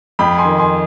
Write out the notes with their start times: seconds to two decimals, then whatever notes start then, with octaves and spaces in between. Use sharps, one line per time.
0.19 F2 G5 B5
0.38 G#5 C6
0.45 D#3
0.58 G#5 C6